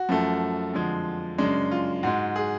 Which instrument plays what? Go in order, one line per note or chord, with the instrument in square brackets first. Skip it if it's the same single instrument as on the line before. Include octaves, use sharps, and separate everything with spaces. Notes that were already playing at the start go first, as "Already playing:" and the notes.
Already playing: [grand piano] F#4
F#2 F3 A3
F2 D3 F3 G#3
F#2 C#3 G#3 D4
F4
G#2 G#3 F#4
G#4